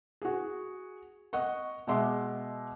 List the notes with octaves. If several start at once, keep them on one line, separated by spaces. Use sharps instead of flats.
F#4 G#4
D#5 F#5 C#6
B2 G#3 E5 C6 D6